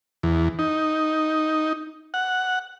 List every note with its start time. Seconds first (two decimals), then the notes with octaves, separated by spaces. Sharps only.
0.23 E2
0.59 D#4
2.14 F#5